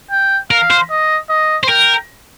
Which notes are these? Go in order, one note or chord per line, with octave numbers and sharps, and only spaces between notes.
G5
A#4 F5
C5
D#5
D#5
C5
A#4 G5